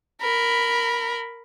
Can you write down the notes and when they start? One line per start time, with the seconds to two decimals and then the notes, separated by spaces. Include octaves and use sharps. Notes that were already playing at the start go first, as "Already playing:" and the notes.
0.22 A#4 B5